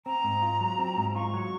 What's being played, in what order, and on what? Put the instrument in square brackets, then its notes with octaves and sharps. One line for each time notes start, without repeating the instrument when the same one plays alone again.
[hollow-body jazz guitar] C4 [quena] A#5
[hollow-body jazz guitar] G#2
F4
F#3
C4
G#2
[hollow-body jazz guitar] F4 [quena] C#6
[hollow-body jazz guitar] F#3